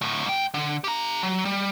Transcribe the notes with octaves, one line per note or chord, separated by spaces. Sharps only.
D2 A2
G#2 G5
D3
G4 A#5
F#3
G3